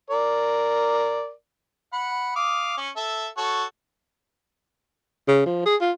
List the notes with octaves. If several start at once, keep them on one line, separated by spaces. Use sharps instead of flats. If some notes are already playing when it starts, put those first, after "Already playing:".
A#4 D5
F#5 B5
F5 D6 D#6
C#4
A4 E5
F#4 A4 C#5
C#3
F3
G#4
F4